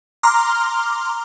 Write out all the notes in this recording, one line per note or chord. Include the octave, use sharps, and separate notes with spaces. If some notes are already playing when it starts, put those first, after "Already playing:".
A#5 C6 D6 F6